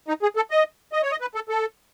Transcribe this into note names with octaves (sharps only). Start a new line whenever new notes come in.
D#4
G#4
A4
D#5
D#5
C#5
D#5
B4
A4
A4